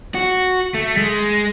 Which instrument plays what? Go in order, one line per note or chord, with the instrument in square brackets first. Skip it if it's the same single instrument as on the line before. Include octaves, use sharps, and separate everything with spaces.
[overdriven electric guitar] F#4
A3
G#3